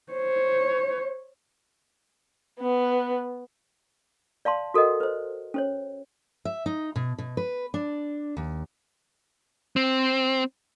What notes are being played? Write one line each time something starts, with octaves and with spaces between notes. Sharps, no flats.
C5 C#5
B3
D5 F5 A5 C6
F#4 A4 A#4 D#5 F#5
B4 C5
C#4 C5 C#5
E5
D#4
B2
B2
B4
D4
D#2
C4